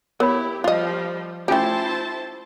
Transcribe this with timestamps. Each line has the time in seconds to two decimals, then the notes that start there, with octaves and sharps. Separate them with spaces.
0.20 B3 E4 G4 A#4 C#5 B5
0.64 F3 G3 F4 D#5
1.48 A3 C#4 E4 F4 G4 C5 G#5 A5